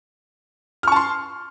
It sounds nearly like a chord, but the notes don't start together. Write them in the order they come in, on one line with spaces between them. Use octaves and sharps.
F6 C#6 A5 C6